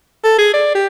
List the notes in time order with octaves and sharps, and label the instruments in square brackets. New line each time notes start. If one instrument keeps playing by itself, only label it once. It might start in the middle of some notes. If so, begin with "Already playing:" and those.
[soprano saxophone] A4
G#4
D5
G4